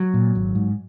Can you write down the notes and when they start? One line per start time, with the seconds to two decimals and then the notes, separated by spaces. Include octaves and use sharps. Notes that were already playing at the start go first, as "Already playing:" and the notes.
Already playing: F#3
0.14 A#2
0.35 G#1
0.55 G#2